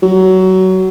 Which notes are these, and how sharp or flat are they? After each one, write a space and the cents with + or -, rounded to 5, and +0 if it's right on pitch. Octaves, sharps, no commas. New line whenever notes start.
F#3 +20